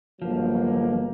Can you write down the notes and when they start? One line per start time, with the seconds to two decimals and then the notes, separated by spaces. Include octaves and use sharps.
0.22 G1 F3 F#3 A#3